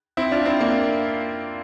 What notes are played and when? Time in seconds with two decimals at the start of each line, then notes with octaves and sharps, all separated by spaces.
0.17 C4 E4
0.32 D4 F4
0.45 C4 E4
0.59 A#3 D4